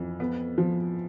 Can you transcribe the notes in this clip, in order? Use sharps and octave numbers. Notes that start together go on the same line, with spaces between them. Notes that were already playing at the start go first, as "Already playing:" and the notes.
Already playing: F2 E3
B3
F3